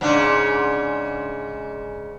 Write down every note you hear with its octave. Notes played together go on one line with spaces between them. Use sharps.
G#2 C#3 D4